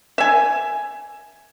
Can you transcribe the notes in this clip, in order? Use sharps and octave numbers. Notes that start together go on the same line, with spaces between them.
E5 G#5